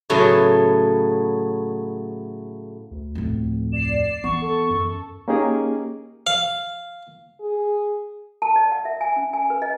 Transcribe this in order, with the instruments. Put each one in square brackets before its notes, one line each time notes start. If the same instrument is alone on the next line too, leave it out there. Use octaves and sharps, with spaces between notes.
[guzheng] A2 C#3 F#3 A3 B3
[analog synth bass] D2
[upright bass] F2 A2
[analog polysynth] D5 C7 [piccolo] E7
[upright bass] E3 [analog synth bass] B3 [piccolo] C#6
[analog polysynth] A4
[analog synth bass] F#2
[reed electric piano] A#3 C#4 D#4 G4 G#4 A#4
[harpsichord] F5
[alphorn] G#4
[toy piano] A5
D5
F#5
E5
G#5
C#4
G#5
B4
D#5